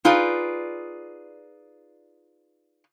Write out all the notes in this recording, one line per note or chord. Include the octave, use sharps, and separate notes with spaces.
D#4 F4 G#4 B4 D5